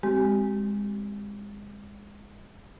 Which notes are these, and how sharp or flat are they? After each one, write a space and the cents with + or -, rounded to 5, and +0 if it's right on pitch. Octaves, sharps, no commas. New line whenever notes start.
G#3 -25 C4 +0 G4 -30